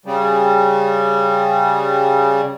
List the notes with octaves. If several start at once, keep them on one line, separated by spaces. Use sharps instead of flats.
C#3 G3